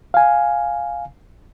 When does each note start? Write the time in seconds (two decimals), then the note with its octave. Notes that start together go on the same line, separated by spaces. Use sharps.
0.14 F5 G#5